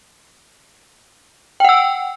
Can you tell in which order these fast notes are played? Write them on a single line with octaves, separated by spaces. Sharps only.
G5 F#5 E6